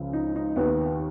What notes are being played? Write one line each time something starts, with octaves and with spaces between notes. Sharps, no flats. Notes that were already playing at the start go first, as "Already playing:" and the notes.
Already playing: C#2 C#3 F3
D#4
D#4
D#2 D#3 B3